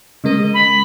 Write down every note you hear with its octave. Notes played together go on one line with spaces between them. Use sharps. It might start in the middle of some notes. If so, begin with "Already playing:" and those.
C#3 G#3 A#4 D#5
B5